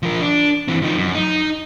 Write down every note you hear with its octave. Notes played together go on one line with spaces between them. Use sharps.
F3 A#4
D4
E3 C4
F3 D#4
F#2
D#4